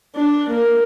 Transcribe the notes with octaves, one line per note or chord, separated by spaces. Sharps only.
D4
A#3